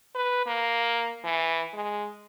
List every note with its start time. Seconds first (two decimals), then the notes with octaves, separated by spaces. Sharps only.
0.15 B4
0.46 A#3
1.25 E3
1.73 G#3